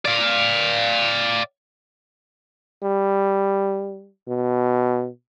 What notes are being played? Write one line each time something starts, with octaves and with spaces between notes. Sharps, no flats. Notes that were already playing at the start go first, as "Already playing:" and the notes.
D5 F5
G3
B2